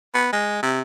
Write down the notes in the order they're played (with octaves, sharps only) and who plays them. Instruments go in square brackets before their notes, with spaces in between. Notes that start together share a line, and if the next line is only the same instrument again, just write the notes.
[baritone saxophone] B3
G#3
C3